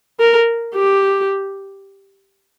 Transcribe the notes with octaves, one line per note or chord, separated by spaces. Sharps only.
A#4
G4